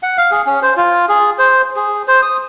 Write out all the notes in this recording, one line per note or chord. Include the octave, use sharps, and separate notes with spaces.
F#5
F5
G#4
C#4
C5
F4
G#4
C5
G#4
C5
D#6